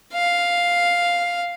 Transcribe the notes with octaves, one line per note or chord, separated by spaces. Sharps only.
F5